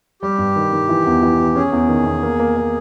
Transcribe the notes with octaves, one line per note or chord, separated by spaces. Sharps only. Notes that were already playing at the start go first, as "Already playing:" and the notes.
G3 G4
G2
D#3
D#3
E3
E2
E3
E3
C#4 G#4
E2
D#3
E2
A#3
A#3
A#3